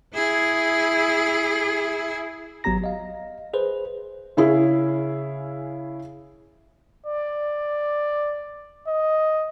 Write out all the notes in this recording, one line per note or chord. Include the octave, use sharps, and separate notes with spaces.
E4 G#4
G#1 F#3 B3 G4 A#5 A#6
D#5 F5
G#4 B4 C5
C#3 C#4 E4 G#4
D5
D#5